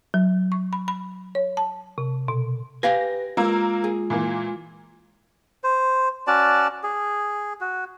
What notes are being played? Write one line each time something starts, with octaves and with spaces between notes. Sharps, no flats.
F#3
C#6
B5
B5
C#5
A5
C3
B2
G4 B4 F5 G#5 A#6
G#3 A#3 F4 A#4 E6
G#4
A#2 E3 A#3
C5
C#4 F#4 D5 A5
G#4
F#4